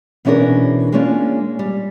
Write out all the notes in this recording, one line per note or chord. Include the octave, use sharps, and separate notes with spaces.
B2 E3 C#4 D4 G#4 A#4
G#3 A#3 C#4 D4 F4
G3